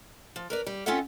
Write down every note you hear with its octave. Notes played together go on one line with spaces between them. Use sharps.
F3
A#4 B4 D5
G3
C4 C#4 F4 A4 E5 F#5